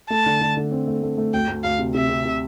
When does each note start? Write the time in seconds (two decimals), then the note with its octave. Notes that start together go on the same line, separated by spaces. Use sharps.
0.10 A3 A5
0.26 D3
0.41 D3
0.57 D3
0.71 C4
0.87 A3
1.03 A3
1.18 A3
1.34 D2 G5
1.48 D2
1.64 D2 F5
1.79 C3
1.94 C3 E5
2.09 C3
2.25 C3